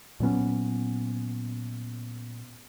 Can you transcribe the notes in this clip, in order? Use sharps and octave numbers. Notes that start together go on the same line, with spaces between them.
A#2 F#3 B3 C#4